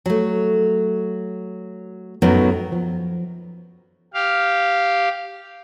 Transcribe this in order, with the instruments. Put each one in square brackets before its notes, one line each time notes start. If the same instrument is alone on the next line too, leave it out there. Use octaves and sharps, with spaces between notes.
[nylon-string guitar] F#3 A3
F#2 A2 F#3 B3 D#4
[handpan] F3
[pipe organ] G4 F5